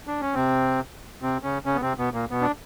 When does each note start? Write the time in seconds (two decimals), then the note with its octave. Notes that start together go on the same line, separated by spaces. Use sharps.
0.07 D4
0.21 C#4
0.34 C3 C4
1.22 C3 C4
1.43 C#3 C#4
1.65 C#3 C#4
1.75 B3
1.82 C3 C4
1.98 B2 B3
2.14 A#2 A#3
2.31 B2 B3
2.41 D4